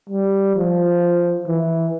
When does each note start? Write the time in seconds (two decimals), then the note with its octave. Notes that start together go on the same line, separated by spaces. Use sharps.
0.10 G3
0.55 F3
1.46 E3